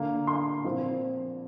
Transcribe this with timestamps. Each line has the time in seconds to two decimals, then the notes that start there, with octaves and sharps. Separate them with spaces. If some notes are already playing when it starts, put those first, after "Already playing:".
Already playing: D3 A#3
0.27 C6
0.64 A#2 F3 C4